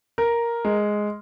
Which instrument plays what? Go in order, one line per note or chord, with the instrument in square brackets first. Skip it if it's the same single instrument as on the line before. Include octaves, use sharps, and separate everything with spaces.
[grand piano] A#4
G#3